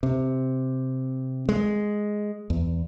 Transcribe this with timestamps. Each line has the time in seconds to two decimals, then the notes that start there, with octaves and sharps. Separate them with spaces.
0.03 C3
1.49 G#3
2.50 E2